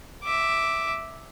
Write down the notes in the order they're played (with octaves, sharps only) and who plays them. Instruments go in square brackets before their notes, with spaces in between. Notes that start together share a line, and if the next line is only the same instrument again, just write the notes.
[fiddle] E5 D6